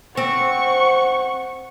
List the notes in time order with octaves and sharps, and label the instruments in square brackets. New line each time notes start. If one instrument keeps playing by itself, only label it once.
[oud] C4 [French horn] C5 [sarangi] F#5 [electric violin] C#6